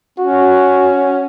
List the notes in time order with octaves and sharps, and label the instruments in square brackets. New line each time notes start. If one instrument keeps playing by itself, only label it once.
[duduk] C#4 [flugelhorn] F#4